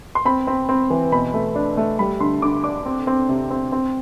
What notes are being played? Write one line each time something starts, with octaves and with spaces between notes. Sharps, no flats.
C6
C4 B5
C4
C4
E3
B2 B5
A3
D4
A3
G3 B5
D3 C6
D3 D6
D4 D6
C4
C4
C3
C4
C4